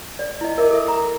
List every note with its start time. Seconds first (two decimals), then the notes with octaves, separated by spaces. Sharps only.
0.19 D5
0.41 E4 D#5
0.58 A#4 E5 D6
0.71 A4 E5
0.88 A#5